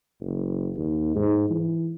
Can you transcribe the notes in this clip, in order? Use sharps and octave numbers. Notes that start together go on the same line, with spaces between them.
F#1
D#2
G#2
E3